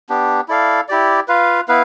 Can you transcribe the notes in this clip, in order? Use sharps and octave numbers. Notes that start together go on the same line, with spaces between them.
B3 D4 G4
E4 A4 D5 F5
E4 G4 D5
F4 B4 F5
B3 E4 B4 F5